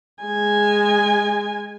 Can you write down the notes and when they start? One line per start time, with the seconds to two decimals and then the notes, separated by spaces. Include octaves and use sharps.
0.24 G#3 G#5